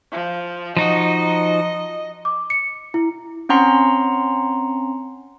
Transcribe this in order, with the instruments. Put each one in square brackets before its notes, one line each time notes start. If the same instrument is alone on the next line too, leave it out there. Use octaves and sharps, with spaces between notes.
[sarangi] F3
[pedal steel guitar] F3 D#4 F#4 [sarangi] D#5
[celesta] D6
C#7
E4
[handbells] C4 C#4 F#5 A#5 C6